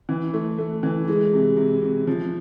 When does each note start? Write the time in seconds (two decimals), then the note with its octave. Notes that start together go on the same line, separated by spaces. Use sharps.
0.09 E3
0.34 A3
0.58 A3
0.83 E3
1.08 G#3
1.33 C3
1.57 C3
1.83 C3
2.07 F3